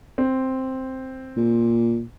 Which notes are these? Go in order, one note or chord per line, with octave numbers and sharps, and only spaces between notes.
C4
A#2